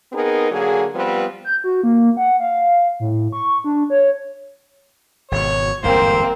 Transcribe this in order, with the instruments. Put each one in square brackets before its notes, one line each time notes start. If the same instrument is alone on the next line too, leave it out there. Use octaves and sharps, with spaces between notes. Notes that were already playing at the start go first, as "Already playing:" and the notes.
[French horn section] B3 C4 D#4 G#4 A#4
D3 F#3 A#3 G#4
F3 G3 B3 C4 B4
[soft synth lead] G6
F#4
A#3
F#5
F5
A2
C#6
D4
C#5
[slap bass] G#1 B2 [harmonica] C#5
[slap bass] G1 E2 G#2 [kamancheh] A#3 C4 [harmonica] C5